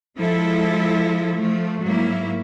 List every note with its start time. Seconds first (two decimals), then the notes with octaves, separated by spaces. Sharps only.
0.18 F3 G#3 E4 A4
1.36 F3 A3
1.82 G#2 F#3 A#3 E4